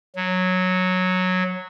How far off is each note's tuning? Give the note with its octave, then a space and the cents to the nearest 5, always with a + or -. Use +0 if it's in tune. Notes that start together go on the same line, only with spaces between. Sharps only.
F#3 -10